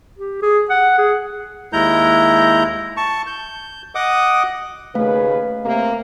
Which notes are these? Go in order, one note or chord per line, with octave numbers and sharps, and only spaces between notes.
G4
G#4
F#5
G#4
D#2 G#3 E4 A#5 G6
A5 C#6
G6
D#5 F#5 D6 D#6
D#2 C#3 A3 B4 F5
C3 A#3